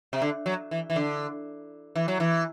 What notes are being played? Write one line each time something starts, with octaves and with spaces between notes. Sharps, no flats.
C3
D3
F#3
E3
E3
D3
E3
F#3
E3